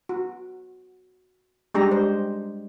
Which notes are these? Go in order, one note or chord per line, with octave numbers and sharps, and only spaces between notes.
F#4
G3 G#3 D4 G4 A#5
C5